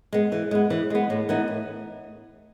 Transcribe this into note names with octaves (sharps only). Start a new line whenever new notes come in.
G#3 B3
E3
G#3 B3
E3
G#3 B3
A2
E3 B3 D#4
A2